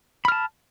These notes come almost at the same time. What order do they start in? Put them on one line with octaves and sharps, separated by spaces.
B5 F6 A5